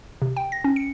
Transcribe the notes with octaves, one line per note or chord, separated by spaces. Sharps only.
C3
G5
A#6
C#4
C#7